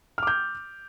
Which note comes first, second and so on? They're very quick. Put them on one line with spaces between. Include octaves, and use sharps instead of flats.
F6 D6 G6